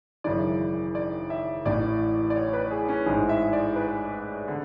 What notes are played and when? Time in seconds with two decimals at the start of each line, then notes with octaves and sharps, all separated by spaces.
0.24 G#1 F#2 C#3 E3 D5
0.95 D5
1.30 E5
1.65 A1 A2 E3 D5
2.30 D5
2.36 C#5
2.53 B4
2.71 G#4
2.89 C#4
3.06 A1 G#2 E3 G#4
3.29 E5
3.53 D5
3.76 B4
4.48 D3